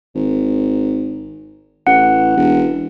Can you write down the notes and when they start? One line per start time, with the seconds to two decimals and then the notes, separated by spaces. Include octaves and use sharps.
0.15 G#1
1.87 A1 F#5
2.37 E1